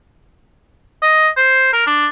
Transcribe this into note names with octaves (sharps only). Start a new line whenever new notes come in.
D#5
C5
A#4
D4